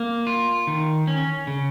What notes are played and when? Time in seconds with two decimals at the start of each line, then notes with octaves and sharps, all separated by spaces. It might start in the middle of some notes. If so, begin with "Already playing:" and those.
Already playing: A#3
0.27 F4
0.67 D#3
1.07 C#4
1.47 C#3